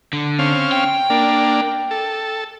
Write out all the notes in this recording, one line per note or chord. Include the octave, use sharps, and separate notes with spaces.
D3
C4 C#4 F5
G5
A#3 D4
A4